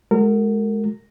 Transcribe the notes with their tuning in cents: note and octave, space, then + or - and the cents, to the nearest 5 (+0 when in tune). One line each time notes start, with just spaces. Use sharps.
G#3 +20 F#4 +0 A#4 -30